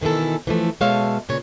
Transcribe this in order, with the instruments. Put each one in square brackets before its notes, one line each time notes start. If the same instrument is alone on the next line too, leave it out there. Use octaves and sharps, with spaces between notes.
[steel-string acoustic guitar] B2 D#3 E3 E4 A4
E3 F3 A3
B2 G#3 A4 C#5 E5 F5
A#2 C#3 B4 C#5